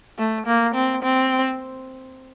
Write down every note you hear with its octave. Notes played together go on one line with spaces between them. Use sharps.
A3
A#3
C4
C4